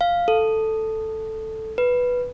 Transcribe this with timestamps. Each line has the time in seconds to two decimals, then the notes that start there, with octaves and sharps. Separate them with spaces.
0.01 F5
0.28 A4
1.78 B4